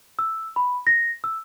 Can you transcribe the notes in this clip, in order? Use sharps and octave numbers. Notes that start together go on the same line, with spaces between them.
E6
B5
A#6
E6